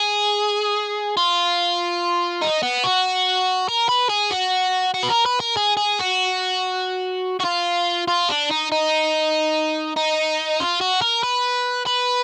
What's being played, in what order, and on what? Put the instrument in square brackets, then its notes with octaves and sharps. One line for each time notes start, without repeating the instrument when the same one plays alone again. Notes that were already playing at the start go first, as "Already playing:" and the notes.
Already playing: [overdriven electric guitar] G#4
F4
D#4
B3
F#4
A#4
B4
G#4
F#4
F#4
B4
A#4
B4
A#4
G#4
G#4
F#4
F#4
F4
F4
D4
D#4
D#4
D#4
F4
F#4
A#4
B4
B4